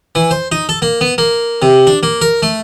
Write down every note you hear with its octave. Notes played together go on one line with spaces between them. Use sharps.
E3
C5
D#4
A4
A#3
B3
A#3
C3
D4
A#3
A#4
A3